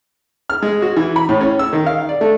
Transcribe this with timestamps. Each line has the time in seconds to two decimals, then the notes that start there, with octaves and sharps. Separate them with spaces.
0.50 F6
0.62 G#3
0.82 F#4
0.97 E3
1.16 B5
1.29 A2
1.41 C#4
1.59 E6
1.73 D#3
1.86 F5
2.09 D5
2.21 A3